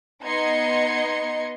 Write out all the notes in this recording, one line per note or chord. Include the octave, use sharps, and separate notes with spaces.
B3 D#4 D#5 C6 G#6 C#7